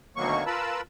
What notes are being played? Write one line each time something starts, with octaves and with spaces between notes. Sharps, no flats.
D2 B2 D#3 F#3 A#3 C#6
F4 A#4 B4 A5 B5 E6